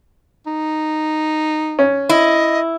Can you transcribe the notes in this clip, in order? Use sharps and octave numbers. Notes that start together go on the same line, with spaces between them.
D#4
C#4
E4 D#5